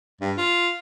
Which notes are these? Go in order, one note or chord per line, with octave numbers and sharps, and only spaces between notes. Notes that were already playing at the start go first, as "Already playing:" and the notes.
G2
F4